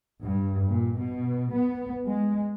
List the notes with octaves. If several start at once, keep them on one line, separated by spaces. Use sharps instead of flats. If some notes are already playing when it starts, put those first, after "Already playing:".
G2
A#2
B2
B3
G#3